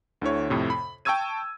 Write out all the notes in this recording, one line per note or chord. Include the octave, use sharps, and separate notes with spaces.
D2 D3 E4 C#5
F2 A2 C3
B5
G5 A5 C#6 E6 G#6 D#7